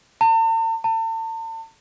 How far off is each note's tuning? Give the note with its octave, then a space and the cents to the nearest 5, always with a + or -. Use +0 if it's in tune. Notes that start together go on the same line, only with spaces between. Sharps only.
A5 +45
A5 +40